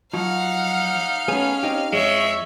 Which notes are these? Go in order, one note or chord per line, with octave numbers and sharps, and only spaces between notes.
F3 F#3 D#4 F5 F#5
A3 B3 C#4 G#4
C4 D#4 G4
F2 G#3 C#5 E5